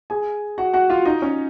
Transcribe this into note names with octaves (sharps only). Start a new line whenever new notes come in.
G#4 G#5
F#4 F#5
F#4 F#5
F4 F5
D#4 D#5
C#4 C#5